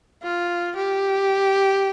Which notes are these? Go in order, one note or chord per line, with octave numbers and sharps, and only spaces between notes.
F4
G4